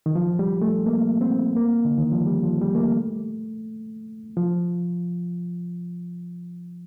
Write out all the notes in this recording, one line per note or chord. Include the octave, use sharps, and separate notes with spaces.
D#3
F3
G3
A3
A#3
C4
A#3
D3
D#3
F3
G3
F3
G3
A#3
A3
F3